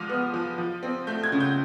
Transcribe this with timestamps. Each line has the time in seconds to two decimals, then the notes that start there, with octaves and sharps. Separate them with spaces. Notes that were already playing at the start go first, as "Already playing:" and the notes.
Already playing: F3 G#3 D6 F6
0.09 B3
0.34 F3
0.58 F3
0.83 C4
1.07 A3 G6
1.24 G#6
1.32 C#3
1.40 G6